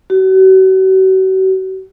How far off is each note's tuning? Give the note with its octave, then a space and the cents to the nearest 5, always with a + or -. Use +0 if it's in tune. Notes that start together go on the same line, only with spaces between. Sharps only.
F#4 +40